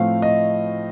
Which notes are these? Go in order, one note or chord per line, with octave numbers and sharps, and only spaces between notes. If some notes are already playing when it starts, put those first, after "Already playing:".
Already playing: A2 F3 A3 C4 F5
D#5